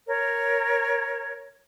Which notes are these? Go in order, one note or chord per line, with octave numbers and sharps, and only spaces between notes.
A#4 C#5